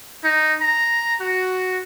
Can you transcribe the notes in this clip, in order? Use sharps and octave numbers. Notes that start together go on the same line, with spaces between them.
D#4
A#5
F#4